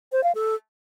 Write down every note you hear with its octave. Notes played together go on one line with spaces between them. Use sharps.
C5
F5
A4